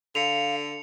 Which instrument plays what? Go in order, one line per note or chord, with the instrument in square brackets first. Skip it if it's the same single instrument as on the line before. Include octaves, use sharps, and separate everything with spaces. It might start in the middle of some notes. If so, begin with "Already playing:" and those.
[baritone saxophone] D3 [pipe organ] F5 [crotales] C#7 F7